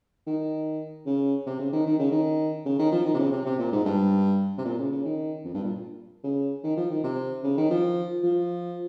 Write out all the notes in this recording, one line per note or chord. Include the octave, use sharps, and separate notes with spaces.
D#3
C#3
C3
C#3
D#3
D#3
C#3
D#3
C#3
D#3
F3
D#3
C3
C#3
C3
C3
A#2
G#2
G2
C3
A#2
C#3
C#3
D#3
F2
G2
A#2
C#3
D#3
F3
D#3
C3
C#3
D#3
F3
F3